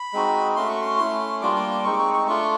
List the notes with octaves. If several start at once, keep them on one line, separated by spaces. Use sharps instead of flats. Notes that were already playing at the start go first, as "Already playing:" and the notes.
Already playing: B5
G#3 C4 D#4 F#4
A3 C#4 F#4 C6
C#6
C6
A3 C#4 E4
G3 A#3 D4 F4 D6
D6
D6
G#3 C4 D#4 C#6
D6
C#6
C#6
A3 D4 F4 C#6